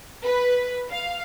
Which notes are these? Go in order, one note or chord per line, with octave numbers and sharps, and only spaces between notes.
B4
F5